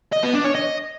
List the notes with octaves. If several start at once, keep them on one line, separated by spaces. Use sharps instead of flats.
D#5
B3
D4
C#5
D#5